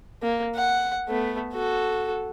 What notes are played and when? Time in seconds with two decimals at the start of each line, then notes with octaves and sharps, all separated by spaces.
0.22 A#3
0.55 F#5
1.09 A3 B3
1.54 F#4 A4